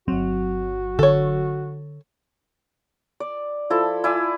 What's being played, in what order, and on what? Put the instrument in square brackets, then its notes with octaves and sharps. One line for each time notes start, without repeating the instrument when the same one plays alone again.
[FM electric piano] G1 F#3 [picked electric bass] C4 [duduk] F#4
[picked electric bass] D3 [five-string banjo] A4 C#5
[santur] D5
F3 E4 A4
E4 D5 G#5 E6